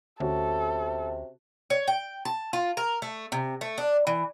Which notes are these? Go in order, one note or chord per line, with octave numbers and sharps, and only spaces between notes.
D2 C3 C#4 F#4 A4
C#5
G5
A5
F4
A#4
A3
C3
A3
D4
E3